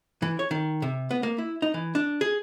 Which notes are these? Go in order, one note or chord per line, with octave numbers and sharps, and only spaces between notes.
E3
C#5
D#3
C3
B3
A#3
E4
D#4
E3
D4
G#4